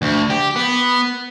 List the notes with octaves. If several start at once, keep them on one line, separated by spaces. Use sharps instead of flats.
D2
G4
B3